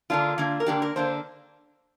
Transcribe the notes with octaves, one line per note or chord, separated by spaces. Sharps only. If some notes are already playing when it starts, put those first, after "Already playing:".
D3 A#3 D4 F4
D3 A#3 D4
A#4
D3 A#3 D4 G4
A#4
D3 A#3 D4 C5